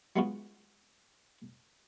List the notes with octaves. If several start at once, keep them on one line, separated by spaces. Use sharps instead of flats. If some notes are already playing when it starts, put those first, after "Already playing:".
F#3 G#3 B3 C#4 F4 F#4